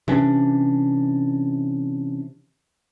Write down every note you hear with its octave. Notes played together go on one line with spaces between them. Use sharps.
C3 E3 C#4 D4